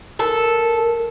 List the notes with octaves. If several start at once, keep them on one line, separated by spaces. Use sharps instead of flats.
A4 A#4